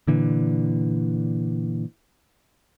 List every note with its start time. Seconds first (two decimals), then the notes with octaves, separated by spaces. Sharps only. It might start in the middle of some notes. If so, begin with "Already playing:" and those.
0.07 A#2 D3 E3